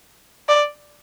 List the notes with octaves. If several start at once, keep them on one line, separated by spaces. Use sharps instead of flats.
D5